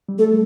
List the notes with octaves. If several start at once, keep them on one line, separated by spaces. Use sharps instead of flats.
G3
A3 A4